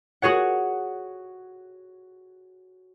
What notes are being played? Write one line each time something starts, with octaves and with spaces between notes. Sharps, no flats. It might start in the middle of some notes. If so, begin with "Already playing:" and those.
F#4 G#4 C#5 F#5